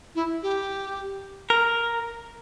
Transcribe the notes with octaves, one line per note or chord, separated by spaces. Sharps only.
E4
G4
A#4